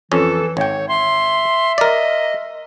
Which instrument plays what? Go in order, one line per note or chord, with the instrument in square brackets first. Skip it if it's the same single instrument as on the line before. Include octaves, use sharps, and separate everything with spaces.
[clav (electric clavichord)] F2 C#4 [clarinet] E3 [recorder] A4
[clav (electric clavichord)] G#1 G5 [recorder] C#5
[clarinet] E5 [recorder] C6
[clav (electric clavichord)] A#4 D5 [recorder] D#5